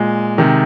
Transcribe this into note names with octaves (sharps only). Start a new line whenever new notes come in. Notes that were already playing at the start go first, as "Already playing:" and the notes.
Already playing: A#2 G#3
C3 D#3